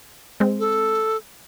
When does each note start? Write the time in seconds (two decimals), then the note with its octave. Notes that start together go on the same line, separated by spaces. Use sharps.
0.40 G#3 C4
0.59 A4